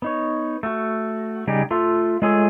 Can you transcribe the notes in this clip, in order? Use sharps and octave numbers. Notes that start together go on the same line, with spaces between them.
B3 D#4 C#5
A3 F#4
C#3 G3 D#4 G4 G#4
A3 F4 A4 F5
G#3 A3 F4 G#4 A4 C#5